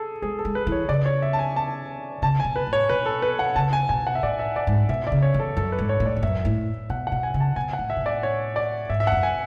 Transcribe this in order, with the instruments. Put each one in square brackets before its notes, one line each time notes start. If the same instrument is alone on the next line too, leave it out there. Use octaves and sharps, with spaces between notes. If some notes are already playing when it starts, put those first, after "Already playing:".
Already playing: [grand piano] G#4 A4
[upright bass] G#3 [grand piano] G#4
[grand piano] A4
[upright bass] G#3
[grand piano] B4
[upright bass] E3
[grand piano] C#5
[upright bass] C#3 [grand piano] D5
[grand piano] C#5
E5
A5
G#5
A5
[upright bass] C#3 [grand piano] A5
[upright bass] B2 [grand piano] G#5
[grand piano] B4
[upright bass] A2
[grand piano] C#5
[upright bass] B2 [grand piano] B4
[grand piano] A4
B4
F#5
[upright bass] C#3 [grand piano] A5
[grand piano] G#5
[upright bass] B2 [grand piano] G#5
[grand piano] F#5
E5
[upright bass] A2 [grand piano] D5
[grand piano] E5
D5
[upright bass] G#2
[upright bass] B2 [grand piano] E5
[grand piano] D5
[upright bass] C#3
[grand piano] C#5
[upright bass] E2
[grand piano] A4
[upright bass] F#2 [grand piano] A4
[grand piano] B4
[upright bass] G#2
[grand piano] C#5
[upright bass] A2
[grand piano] D5
[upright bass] E2
[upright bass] F#2 [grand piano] E5
[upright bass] A2
[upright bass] B2 [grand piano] F#5
[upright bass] B2 [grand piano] F#5
[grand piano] G#5
[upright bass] C#3
[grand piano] A5
[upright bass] B2 [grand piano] G#5
[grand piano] F#5
[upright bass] A2
[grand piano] E5
[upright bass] B2
[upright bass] A2 [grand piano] D5
[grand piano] C#5
D5
[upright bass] G#2 [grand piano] E5
[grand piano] E5
[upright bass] F#2 [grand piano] F#5
[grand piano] G#5